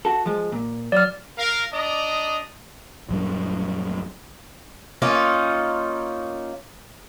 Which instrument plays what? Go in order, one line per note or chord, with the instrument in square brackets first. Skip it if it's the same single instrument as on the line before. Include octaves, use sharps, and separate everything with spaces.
[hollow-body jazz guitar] F#4 A4
F3 G#3
A#2
[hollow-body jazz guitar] F#3 [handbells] D5 F6
[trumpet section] A#4 F5
D4 D5 D#5 A#5 D#6
[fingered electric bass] A#1 F#2 G3
[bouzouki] A#3 C#4 D#4 F4